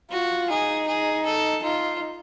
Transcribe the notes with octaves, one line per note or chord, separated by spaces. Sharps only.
F4 F#4
D#4 G#4
G#4
A4
D#4 F4